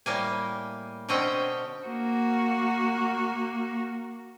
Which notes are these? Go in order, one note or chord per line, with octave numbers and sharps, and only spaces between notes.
A2 G3 A#3 G#5
B2 D3 C4 C#4 D#5 G5
A#3 F#4